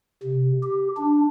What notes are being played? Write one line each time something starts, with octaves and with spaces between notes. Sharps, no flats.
C3
G4
D4